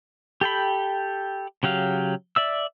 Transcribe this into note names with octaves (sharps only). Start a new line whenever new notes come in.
G4 A4 G5 B5
C#3 F#3 G4 F5
D5 E5 E6